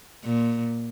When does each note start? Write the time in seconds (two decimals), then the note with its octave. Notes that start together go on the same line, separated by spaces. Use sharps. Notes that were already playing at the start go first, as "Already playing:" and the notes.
0.24 A#2